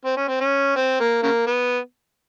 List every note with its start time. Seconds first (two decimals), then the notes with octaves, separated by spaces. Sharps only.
0.05 C4
0.17 C#4
0.28 C4
0.41 C#4
0.76 C4
1.00 A#3
1.23 C#3 A#3
1.47 B3